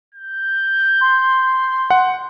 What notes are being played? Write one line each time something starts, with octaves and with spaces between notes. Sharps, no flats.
G6
C6
F#5